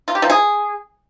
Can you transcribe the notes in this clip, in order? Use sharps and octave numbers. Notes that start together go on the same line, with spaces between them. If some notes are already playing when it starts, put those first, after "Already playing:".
F4
G4
F3
G#4